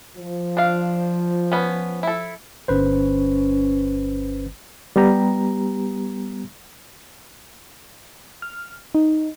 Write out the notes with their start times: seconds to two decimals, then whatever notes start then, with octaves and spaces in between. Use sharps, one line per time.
0.16 F3
0.57 D4 F5
1.52 B3 C#4
2.03 E4 A4
2.68 G1 C#4 B4 C5
4.96 G3 B3 G4 A#5
8.42 F6
8.95 D#4